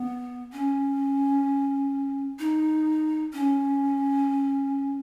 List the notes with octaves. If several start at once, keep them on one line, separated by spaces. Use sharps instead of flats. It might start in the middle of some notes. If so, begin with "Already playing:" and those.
Already playing: B3
C#4
D#4
C#4